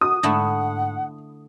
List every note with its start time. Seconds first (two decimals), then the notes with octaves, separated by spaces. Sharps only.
0.01 F#4 D#6
0.23 G#2 D3 A3 E4 F#5